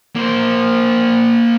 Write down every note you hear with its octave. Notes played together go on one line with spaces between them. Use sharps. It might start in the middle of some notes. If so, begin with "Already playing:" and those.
A#3 C5